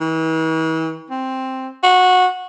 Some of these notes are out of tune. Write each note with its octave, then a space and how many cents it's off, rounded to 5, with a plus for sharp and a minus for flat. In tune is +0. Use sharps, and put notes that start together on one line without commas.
E3 -40
C4 +5
F#4 -15